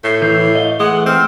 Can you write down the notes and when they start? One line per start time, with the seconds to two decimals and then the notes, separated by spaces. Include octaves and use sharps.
0.04 A2 C7
0.22 E3 G6 C7
0.55 D#5 F5 G7
0.80 E3 G#3 A3 F#5 D#6
1.06 C4 F6